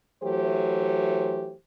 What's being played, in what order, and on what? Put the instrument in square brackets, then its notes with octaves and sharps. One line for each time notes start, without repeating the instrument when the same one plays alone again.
[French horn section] E3 F#3 A3 G4 C5